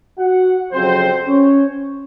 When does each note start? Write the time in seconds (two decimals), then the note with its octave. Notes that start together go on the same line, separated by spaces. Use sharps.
0.19 F#4 F#5
0.72 F2 C#3 F#3 C4 C5
1.26 C#4 C#5